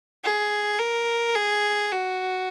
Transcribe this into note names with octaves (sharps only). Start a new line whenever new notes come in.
G#4
A#4
G#4
F#4